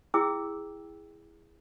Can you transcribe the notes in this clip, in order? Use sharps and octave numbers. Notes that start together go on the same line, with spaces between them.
E4 G#4 G5 D6 E6